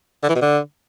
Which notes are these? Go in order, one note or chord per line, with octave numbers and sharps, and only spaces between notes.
D3
E3
B2
D3